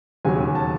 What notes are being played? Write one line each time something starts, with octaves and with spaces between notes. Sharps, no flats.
E1 D#2 C#3 F#3 G#5
G#5
A5